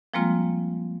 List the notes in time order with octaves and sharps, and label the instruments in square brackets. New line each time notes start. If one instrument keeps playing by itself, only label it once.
[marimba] F3 G3 G#3 A#3 C4 F4